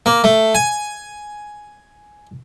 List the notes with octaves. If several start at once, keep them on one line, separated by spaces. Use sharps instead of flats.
A#3
A3
G#5